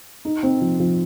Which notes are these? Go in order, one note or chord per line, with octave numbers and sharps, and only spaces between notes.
D#4
C4
F3
F3